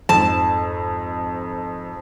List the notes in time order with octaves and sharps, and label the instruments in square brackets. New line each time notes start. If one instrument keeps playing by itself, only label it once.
[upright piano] F2 G#2 [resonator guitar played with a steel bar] A5